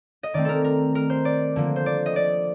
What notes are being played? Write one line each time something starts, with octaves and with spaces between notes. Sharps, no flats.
D#5
D#3 A3 C4 D5
A4 A#4
A#4
A#4
C5
D5
D3 F3 A#3
C5
D5
D#5
D5